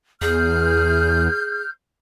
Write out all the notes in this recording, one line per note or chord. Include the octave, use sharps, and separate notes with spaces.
E2 G#4 F6 G6